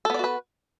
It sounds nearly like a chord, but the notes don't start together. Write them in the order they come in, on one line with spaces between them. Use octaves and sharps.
A4 B3 D5 F#4 B4